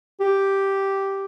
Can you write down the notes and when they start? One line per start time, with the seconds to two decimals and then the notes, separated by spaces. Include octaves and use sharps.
0.20 G4